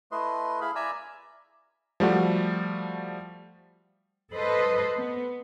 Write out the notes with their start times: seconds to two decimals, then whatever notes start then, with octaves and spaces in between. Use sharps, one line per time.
0.12 A3 E4 B4 D#5 C6
0.61 E4 G#4 F5 B5
0.75 D5 E5 G#5 A#5 E6
2.00 F3 G3 A3 F#4
4.33 A4 B4 C5 D#5
4.98 B3